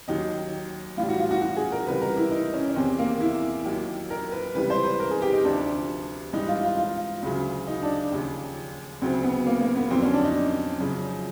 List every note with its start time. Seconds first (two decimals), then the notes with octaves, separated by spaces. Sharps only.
0.08 D#2 D#3 F#3 D#4
0.97 A2 E3 G3 F4
1.08 F#4
1.19 F4
1.31 F#4
1.42 F#4
1.57 G#4
1.72 A#4
1.86 C#2 C3 E3 G3 B4
2.01 A#4
2.17 E4
2.31 D#4
2.53 C#4
2.70 C#4
2.76 E2 C3 D#3 C4
2.99 A#3
3.20 E4
3.65 D#2 D#3 F#3
4.10 A#4
4.32 B4
4.55 C#2 C3 E3 G3 B4
4.70 C5
4.85 B4
5.00 A#4
5.11 G#4
5.22 G4
5.33 D#4
5.44 D2 C3 F3 D4
6.33 G#2 E3 G3 D#4
6.48 F4
6.63 F4
6.78 F4
7.23 D2 C#3 F#3
7.67 D#4
7.83 D4
8.12 D#2 C#3 F3
9.02 D2 C#3 F#3 C4
9.23 B3
9.46 A#3
9.61 A#3
9.76 B3
9.90 F2 D3 F#3 C4
10.02 C#4
10.13 D4
10.24 D#4
10.80 F#2 C#3 F3